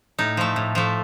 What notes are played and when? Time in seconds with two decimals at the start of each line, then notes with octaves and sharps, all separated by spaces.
0.19 A2 D#4
0.37 F3 A3
0.56 A2
0.75 F3 A3